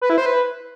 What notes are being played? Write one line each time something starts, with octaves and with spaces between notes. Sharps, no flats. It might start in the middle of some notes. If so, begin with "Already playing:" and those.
B4
E4
C5
B4